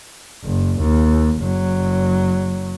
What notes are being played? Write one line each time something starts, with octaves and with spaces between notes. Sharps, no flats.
F#1
D#2
F#1 F#3